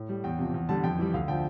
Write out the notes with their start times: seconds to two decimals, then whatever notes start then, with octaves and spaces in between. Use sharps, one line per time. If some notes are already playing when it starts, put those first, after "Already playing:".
Already playing: A2
0.09 G3
0.24 E2 G5
0.39 C3 F3
0.54 E2
0.69 D3 G3 A5
0.84 F2 G5
0.98 E3 G3
1.14 D2 F5
1.28 D3 F3 G5